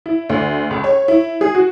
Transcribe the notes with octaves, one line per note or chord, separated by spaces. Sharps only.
E4
D2
C#2
C#5
E4
G#4
F#4